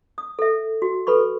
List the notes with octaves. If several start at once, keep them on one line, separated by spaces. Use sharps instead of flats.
D#6
A4 E5
F#4
A4 B4 B5 C#6